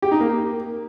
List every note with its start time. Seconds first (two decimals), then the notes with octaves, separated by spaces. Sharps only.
0.02 G4
0.11 D#4
0.20 A#3